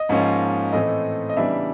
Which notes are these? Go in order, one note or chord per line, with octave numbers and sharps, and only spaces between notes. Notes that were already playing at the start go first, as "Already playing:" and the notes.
Already playing: D#5
G#2 F3 A#3 C#4
A2 E3 A3 C4 D#5
D#5
C#3 E3 G3 B3 D4 E5